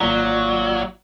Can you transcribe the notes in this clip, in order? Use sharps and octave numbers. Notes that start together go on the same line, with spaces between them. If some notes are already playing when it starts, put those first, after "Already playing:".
G#1 F#3 A#3 F4 D5 A#5 B6